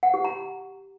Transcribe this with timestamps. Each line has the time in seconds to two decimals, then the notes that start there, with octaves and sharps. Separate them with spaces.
0.03 F#5
0.14 G4
0.25 A#5